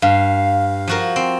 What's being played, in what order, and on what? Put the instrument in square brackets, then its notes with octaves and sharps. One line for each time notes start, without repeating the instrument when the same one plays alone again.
[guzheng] G2 [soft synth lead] F5
[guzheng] F3 F#4 A#4
C4